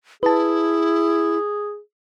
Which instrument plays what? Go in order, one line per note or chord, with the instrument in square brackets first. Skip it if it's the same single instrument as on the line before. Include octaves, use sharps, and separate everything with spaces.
[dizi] E4 [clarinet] G#4 [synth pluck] B4 A5